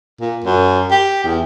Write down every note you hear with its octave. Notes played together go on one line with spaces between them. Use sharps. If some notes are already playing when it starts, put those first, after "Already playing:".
A#2
F#2
G4
E2